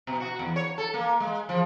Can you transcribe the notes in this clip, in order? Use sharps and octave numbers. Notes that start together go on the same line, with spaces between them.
B2
F#4
E2
C#5
A4
A#3
G#3
F3